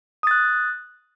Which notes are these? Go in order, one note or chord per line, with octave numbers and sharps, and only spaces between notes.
D#6 F#6 A6